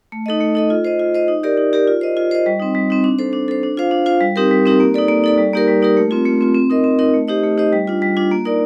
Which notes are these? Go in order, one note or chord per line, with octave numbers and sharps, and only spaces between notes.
A3
D#4 A4 D#5
A3
D#4 A4 D#5
F4
C5 D#5
F4
C5 D#5
D#4
G4 A#4 D5
D#4
G4 A#4 D5
F4
C5 D#5
F4
C5 D#5
G3
C4 D#4
G3
C4 D#4
D4
A4 C5
D4
A4 C5
D4
F4 C5 F5
D4
F4 C5 F5
G3
C4 D#4 G4 A#4
G3
C4 D#4 G4 A#4
A#3
D#4 A4 D5
A#3
D#4 A4 D5
G3
A#3 D#4 G4 A#4
G3
A#3 D#4 G4 A#4
A3
C4 F4
A3
C4 F4
C4
D#4 A#4 D#5
C4
D#4 A#4 D#5
A3
D#4 G4 C5 D#5
A3
D#4 G4 C5 D#5
G3
D4 F4
G3
D4 F4
A#3
D#4 A#4 D5